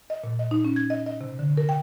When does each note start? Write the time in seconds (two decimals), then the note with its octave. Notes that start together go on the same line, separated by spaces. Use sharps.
0.10 D#5
0.24 A#2
0.39 D#5
0.51 D#4
0.65 C#4
0.76 G#6
0.90 D#5
1.06 D#5
1.21 C3
1.39 D3
1.57 A#4
1.69 G5